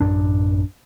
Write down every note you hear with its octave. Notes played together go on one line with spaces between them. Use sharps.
A1 F#2 D4